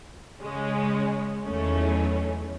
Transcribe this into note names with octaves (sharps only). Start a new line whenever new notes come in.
C#3 G#3 C#4
E2 D#3 F#3 A3 C#4